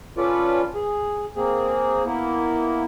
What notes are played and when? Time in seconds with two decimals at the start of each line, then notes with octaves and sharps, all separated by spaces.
0.17 C#4 F4 A4 B4 D5
0.75 G#4
1.36 A#3 C4 G#4
2.05 A#3 B3 E4